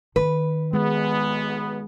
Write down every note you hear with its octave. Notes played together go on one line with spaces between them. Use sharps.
D#3 B4
B1 G#3 B3